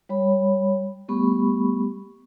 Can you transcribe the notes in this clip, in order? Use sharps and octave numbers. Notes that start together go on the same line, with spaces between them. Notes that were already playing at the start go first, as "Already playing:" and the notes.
G3 C#5 B5
G3 A3 B3 G4 B5 C#6